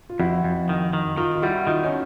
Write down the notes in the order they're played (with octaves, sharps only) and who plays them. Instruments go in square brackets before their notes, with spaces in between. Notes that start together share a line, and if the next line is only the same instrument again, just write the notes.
[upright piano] F4
[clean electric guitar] F2 [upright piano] E4 F#4
[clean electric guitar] F2
D#3
D#3
[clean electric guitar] D#3 [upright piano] D#4 F4
[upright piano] F4
[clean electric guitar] G3 [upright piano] E4 F#4
[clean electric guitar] D#3 [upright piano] D#4 F4
[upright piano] C#4 D#4